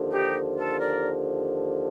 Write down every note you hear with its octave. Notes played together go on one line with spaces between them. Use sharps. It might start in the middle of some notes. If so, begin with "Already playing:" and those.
Already playing: D#2 D3 F3
D#4 G4
F4 A4
A#4 D5